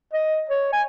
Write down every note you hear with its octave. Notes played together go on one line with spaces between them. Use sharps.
D#5
C#5
G#5